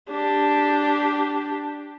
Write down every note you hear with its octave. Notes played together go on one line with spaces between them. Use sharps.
D4 G4